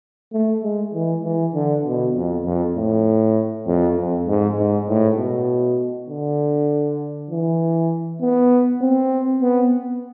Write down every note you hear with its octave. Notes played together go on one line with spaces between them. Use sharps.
A3
G#3
E3
E3
D3
B2
F2
F2
A2
F2
F2
G#2
G#2
A2
B2
D3
E3
B3
C4
B3